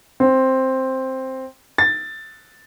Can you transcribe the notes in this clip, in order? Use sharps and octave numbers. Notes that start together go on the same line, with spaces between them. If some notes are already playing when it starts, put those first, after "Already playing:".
C4
A6